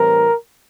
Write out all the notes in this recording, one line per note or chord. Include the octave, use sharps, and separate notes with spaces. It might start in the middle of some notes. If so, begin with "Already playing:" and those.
Already playing: A2 E3 G3 C4 A#4